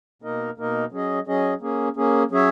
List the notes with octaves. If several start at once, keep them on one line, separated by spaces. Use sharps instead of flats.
B2 A#3 D#4 A#4 D#5
B2 A#3 D#4 A#4 D#5
F#3 C#4 G#4 D#5
F#3 C#4 G#4 D#5
A#3 C#4 G#4
A#3 C#4 G#4
F#3 C#4 G#4 C#5 E5